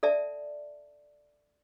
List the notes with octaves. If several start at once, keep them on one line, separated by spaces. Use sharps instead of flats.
A4 D5 E5 A5